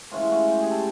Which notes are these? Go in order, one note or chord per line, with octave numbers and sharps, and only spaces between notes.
A2 E3 G#3 C#4 F4
F#4
G4
G#4
A4